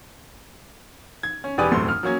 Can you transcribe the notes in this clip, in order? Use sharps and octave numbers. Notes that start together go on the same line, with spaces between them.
G#6
C#4
E1 G4 B4 D5 G#5 D#6
E1 F#2 A2 A3 C4 C6
F6
F#3 A#3 C#4 G#6